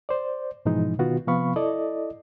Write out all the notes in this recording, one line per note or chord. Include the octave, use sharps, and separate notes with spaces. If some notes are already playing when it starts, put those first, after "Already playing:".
C5 D5
G#2 B2 E3 F3 G#3 D#4
B2 D#3 B3 F4 F#4
C3 F3 B3 F5 B5 C#6
E4 A4 D5 D#5